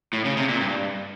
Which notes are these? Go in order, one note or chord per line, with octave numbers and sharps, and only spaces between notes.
A2
C#3
C3
A#2
G2